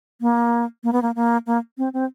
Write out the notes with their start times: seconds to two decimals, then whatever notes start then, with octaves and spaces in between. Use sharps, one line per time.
0.21 A#3
0.84 A#3
0.93 B3
1.02 A#3
1.16 A#3
1.47 A#3
1.78 C4
1.93 C4